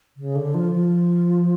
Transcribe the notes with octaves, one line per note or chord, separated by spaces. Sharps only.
C#3
D3
F3
F3